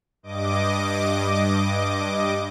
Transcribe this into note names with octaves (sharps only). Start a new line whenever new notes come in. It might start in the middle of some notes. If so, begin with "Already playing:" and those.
G2 D#5 D6